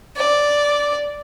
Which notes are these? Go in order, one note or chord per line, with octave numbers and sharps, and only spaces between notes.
D5